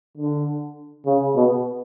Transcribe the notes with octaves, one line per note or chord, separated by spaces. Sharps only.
D3
C#3
B2